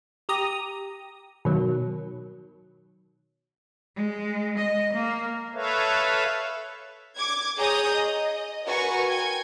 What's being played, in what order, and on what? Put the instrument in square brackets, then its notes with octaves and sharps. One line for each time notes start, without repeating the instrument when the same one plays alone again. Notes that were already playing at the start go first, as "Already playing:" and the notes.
[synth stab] G4 A#5 D#6
B2 D#3 F#3
[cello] G#3
D#5
A#3
[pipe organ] A4 B4 C#5 E5 F5
[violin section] D6 G#6
G#4 C#5 A#5 D#6 G6
D#5
F#4 A#4 B4 G#5 C#6
G5 G#5 G#6